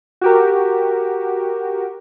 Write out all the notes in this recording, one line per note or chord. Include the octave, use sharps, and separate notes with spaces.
F#4 G4 A#4